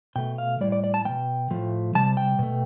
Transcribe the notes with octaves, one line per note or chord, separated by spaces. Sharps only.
B2 A3 G5
F5
A2 G3 D5
D5
D5
A5
B2 G3 G5
A2 F3 A3
C3 G3 A5
G5
B2 A3